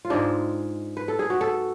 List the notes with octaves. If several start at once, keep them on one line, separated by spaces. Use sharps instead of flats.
F4
G#2 G#3 D4
B4
A4
G#4
F#4
A4